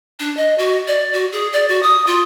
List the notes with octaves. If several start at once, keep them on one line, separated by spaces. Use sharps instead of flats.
D4
D#5
F#4
D5
F#4
G#4
D5
F#4
D#6
F4